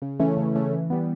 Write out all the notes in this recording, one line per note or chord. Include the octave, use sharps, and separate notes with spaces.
C#3
E3 A3 C#4
C#3
E3 A3 C#4
E3
G3 B3